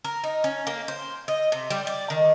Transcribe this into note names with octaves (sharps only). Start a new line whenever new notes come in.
A#4
D#4
C#4
A#3
C5
D#5
C3
G3
D5
D#3